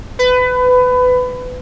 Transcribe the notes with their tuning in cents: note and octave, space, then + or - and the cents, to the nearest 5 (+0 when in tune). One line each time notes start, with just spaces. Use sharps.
B4 +25